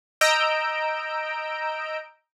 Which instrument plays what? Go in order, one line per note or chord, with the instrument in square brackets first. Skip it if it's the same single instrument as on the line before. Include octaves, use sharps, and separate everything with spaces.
[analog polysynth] D#5 A#5 E6 G6 D7